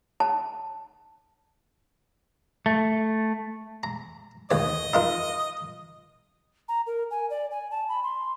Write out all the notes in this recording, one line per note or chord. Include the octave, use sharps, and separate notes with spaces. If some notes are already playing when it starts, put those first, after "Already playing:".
A5
A3
A#5
D#2 C#5 D#5
D#4 F4 A#4
A#5
A#4
G#5
D5
G#5
A5
B5
C6